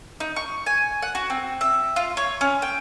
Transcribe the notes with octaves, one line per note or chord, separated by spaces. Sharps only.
D#4
C#6
G#5
F#5
F#4
C4
E5
F4
C#5
C#4
G5